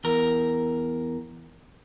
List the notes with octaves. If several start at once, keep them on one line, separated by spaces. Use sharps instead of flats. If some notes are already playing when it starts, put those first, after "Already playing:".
E2 A#4